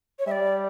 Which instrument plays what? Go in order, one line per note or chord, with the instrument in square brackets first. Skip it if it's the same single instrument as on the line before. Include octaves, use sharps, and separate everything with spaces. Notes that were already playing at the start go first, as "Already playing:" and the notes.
[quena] C#5
[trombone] G3 [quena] D5 E5